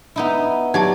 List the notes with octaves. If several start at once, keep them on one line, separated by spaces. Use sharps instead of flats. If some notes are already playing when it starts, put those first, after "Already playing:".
B3 D#4 E4
F#3 D#4 G4 D5 A5